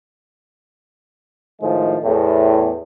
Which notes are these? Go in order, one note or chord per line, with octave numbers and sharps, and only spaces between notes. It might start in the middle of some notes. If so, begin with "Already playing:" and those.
A2 D#3 F3 G#3
E2 A2